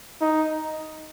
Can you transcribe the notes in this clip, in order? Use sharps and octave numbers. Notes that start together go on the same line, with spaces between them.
D#4